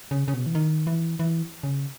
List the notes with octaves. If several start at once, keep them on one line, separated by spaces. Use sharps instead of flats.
C#3
C#3
B2
E3
D#3
E3
E3
C#3